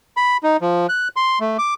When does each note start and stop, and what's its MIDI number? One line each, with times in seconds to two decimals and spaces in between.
0.17 0.37 83
0.43 0.57 63
0.61 0.87 53
0.89 1.08 90
1.16 1.39 84
1.40 1.57 57
1.58 1.74 86